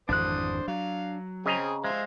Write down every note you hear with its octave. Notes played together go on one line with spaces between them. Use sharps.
G#1 F2 E3 D4 C5 D#6 F#6
F#3 F5
C#3 C4 G#4 D#5 A#5
G#3 C5 E5 F5